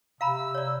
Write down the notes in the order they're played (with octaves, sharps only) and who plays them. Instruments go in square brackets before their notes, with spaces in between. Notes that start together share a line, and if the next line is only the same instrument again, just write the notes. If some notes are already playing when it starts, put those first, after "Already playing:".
[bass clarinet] C3 [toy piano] F5 A#5 B5 [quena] E6
[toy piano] C#5 D5